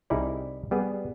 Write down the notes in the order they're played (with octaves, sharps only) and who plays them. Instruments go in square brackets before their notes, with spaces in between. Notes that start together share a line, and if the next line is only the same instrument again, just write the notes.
[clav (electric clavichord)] C2 G3 D#4 E4 G#4 D5
G3 B3 G#4